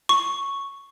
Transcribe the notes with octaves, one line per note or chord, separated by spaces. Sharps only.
C#6